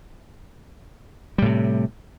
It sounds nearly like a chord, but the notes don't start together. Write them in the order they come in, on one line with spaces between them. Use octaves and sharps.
G3 A2 C3